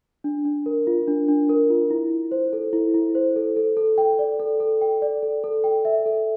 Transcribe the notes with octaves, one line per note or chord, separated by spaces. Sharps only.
D4
D4
A#4
F4
D4
D4
A#4
F4
E4
E4
C5
A4
E4
E4
C5
A4
A4
A4
G5
D5
A4
A4
G5
D5
A4
A4
G5
E5
A4